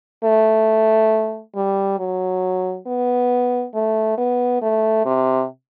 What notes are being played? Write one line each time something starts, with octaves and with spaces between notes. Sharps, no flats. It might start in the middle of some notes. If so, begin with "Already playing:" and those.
A3
G3
F#3
B3
A3
B3
A3
C3